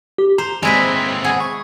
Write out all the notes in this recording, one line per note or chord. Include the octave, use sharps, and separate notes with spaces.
G4
C5 A#5
D#2 G#3 C4 E4 B4
G#4 F#5
C#6